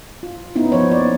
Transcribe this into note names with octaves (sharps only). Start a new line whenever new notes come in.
F4
B3 C#4 D#4 E4
F3 C#4 D#4 C5 C#5
A#3 D5